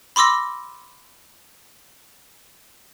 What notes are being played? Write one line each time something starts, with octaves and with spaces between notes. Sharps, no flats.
B5 C6 D6 E6 A#6